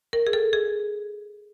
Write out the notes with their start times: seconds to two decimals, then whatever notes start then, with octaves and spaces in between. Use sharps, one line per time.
0.13 A#4
0.27 G#4
0.33 A4
0.53 G#4